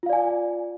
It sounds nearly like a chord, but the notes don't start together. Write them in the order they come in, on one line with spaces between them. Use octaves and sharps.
F4 F5 D5 G#5